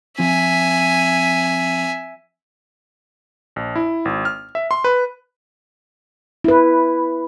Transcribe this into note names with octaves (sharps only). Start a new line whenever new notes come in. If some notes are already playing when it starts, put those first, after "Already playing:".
F3 C4 E5 G#5
A#1
E4
G#1
F6
E5
C6
B4
E4 B4